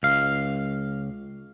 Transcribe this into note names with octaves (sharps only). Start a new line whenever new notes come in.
C#2 F5